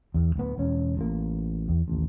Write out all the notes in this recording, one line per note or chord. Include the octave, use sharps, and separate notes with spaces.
E2
D1 B3
E1 C#4
A1 A#3
E2
A1 D#2